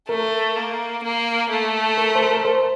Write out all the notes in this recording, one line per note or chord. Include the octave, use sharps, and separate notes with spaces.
A3 A#4
A#3
A#3
A3
A#4
C5
A#4
A#4
C5